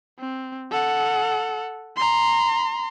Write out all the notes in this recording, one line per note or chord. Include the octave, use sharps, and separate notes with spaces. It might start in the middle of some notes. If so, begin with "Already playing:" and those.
C4
A4 F#5
A#5 C6